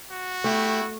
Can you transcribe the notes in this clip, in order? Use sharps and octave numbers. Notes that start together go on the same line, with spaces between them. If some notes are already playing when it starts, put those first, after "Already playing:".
F#4
A3 E4 G4